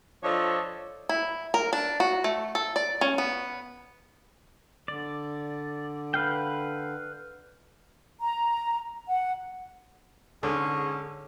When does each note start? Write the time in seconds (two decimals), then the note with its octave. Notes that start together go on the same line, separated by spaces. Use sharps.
0.23 F3 D4 A4 C#5 D#5
1.09 E4
1.54 A#4
1.73 D4
2.00 F#4
2.24 A3
2.55 A4
2.76 D5
3.01 C#4
3.18 B3
4.88 D3 D5
6.14 B4 F5 G5
8.20 A#5
9.07 F#5
10.43 G#2 D3 C#4 G#4